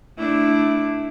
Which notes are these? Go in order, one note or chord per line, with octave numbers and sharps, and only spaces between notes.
A3 D4 E4